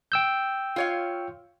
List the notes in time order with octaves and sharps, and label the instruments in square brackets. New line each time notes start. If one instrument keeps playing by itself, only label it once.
[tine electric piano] G5 E6 G6
[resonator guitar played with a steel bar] F4 C#5 F5